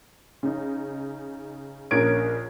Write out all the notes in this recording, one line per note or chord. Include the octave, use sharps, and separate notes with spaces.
C#3 D#4
A#1 C#4 A#4 G#6 D7